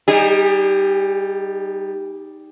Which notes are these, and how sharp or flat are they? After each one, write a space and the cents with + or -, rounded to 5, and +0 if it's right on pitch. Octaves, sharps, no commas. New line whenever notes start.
G3 +0 D#4 +0 G#4 -35